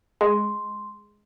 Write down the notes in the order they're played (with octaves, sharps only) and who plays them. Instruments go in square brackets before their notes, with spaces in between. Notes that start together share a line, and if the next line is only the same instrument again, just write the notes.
[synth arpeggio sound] G#3 [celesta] C6